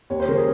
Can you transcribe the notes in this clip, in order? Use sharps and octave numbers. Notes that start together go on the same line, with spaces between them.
D#2 C#5
C5
C#3 A#4
G#4